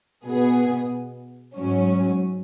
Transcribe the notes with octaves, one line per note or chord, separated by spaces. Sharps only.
B2 B3 G#4
G#2 F#3 C#4